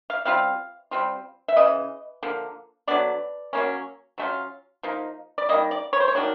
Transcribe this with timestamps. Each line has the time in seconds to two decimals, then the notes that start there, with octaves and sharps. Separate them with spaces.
0.10 F5
0.25 G3 C4 F4 F5
0.91 G3 C4 F4
1.48 E5
1.57 C#3 E3 D#5
2.23 D3 F3 A#3
2.87 D3 F#3 B3 D4 D5
3.53 F#3 A#3 C#4
4.18 F#3 A3 C#4 F4
4.83 F3 A#3 D#4
5.38 D5
5.49 D#3 G3 A#3 D#5
5.71 D5
5.93 C#5
6.00 C5
6.08 C#5
6.15 D#3 F#3 A#3 D4